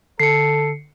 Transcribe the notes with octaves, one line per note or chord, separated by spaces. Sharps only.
D3 A4 C7 C#7